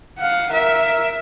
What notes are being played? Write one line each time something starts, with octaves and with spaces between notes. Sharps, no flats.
F5 F#5
A#4 E5